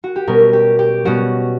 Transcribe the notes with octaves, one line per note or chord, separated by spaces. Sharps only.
F#4
G4
B2 G3 C#4 A#4
G4
G4
B2 G3 C#4 F#4